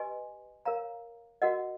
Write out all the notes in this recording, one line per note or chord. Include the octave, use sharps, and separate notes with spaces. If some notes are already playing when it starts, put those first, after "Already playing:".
Already playing: G4 B4 D#5 G#5 C6
A#4 C#5 F5 A#5
F#4 A#4 D#5 F#5